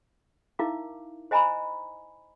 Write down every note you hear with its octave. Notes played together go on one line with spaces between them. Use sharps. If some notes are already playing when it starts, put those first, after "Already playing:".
D#4 E4 A#4 E5 F5 D6
C5 D#5 G#5 A#5 B5